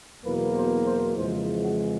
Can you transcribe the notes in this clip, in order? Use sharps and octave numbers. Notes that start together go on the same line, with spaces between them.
E2 B2 F#3 A#3 B4
C5
C5
F2 C#3 E3 G#3 C5
F#4